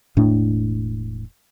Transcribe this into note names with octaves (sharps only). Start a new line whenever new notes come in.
E1 A2 A3 D4